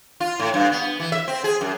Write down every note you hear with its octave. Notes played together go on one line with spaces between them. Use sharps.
F4
A2
G2
B3
E3
E5
C4
G#4
F#2